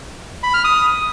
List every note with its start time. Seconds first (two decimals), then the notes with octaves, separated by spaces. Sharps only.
0.43 B5
0.54 F6
0.64 D#6